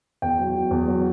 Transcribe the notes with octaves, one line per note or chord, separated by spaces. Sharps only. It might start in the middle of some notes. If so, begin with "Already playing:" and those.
E2 G5
F#3
F#3
E2
F#3